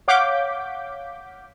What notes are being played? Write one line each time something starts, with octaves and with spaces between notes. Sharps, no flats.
C#5 F5 F#5 D6 G6 B6